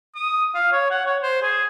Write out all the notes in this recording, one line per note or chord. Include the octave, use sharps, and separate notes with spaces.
D#6
F5
C#5
F#5
C#5
C5
G#4